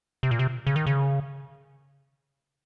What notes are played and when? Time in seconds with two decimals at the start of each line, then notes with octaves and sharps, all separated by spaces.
0.23 C3
0.31 A#2
0.39 C3
0.67 C#3
0.76 D#3
0.87 C#3